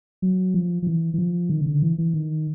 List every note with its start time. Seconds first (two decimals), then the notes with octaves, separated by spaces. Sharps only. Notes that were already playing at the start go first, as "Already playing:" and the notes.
0.22 F#3
0.54 F3
0.82 F3
0.87 E3
1.14 E3
1.18 F3
1.50 D#3
1.61 C#3
1.66 D3
1.82 E3
1.98 E3
2.13 D#3